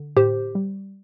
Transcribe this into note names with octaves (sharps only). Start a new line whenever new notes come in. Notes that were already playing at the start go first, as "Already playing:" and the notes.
Already playing: D3
A2 G4 C5
G3